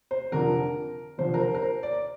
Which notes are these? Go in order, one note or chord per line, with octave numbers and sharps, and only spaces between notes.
C5
F1 F2 D3 F3 A#4
F1 F2 D3 F3 C5
A#4
C5
A#4
C5
D5